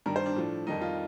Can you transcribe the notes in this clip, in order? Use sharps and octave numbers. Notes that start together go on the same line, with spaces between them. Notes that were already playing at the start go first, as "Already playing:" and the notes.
G2 D#3 G3 A#4
C5
D4
A2 F3
F2 D#3 G3 D#4
F4